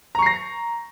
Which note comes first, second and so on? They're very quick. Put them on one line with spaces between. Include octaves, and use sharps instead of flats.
A#5 C#6 C7 A#6